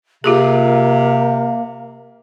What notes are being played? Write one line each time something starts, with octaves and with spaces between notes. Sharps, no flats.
C3 A#3 F4 G4 G#4